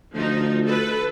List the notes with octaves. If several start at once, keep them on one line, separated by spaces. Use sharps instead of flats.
D2 F3 D#4
A4 B4